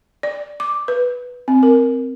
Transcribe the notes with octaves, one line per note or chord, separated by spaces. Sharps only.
D5
D6
B4
C4
A#4